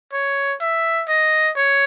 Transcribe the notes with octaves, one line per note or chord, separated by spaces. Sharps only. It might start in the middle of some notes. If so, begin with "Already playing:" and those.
C#5
E5
D#5
C#5